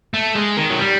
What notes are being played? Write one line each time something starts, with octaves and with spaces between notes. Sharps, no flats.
A3
G#3
D#3
F#3
G3